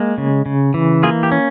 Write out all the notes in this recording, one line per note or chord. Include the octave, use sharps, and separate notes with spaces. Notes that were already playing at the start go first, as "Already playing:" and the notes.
Already playing: G#3 A#3
C#3
C#3
E3
A#3 F4 G#4
G4
C#4